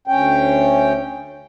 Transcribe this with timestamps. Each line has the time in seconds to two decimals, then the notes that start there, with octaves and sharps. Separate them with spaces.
0.08 D2 C#4 G5